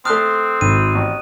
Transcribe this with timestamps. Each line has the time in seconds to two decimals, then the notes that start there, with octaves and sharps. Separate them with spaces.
0.05 A3 C4 C6 D#6 F6 F#6
0.61 G#1 D#7
0.94 A1